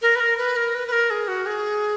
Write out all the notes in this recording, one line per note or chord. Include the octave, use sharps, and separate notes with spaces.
A#4
B4
A#4
B4
A#4
B4
B4
A#4
G#4
F#4
G#4